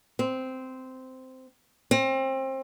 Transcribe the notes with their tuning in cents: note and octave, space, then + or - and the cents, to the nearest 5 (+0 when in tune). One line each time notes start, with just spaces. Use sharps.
C4 -10
C4 +30